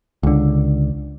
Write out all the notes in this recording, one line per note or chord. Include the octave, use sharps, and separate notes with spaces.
C#2 D3